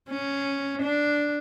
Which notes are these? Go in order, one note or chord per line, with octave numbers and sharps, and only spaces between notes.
C#4
D4